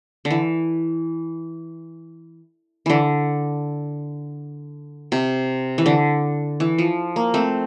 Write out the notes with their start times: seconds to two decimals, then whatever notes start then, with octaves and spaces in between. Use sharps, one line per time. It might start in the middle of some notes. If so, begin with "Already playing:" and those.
0.25 D3
0.30 E3
2.86 D3 E3
5.12 C3
5.78 E3
5.86 D3
6.60 E3
6.78 F3
7.16 A#3
7.34 A3 C4